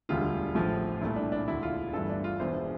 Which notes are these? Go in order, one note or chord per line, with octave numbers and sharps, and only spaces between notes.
E1 D2 D3 G3 F4
A1 A2 F3 A3
C2 A#2 A3 E4
D4
D4
E1 D2 D3 E4
F4
G1 G2 E3 A3 A4
D4
F4
E1 E2 E3 C5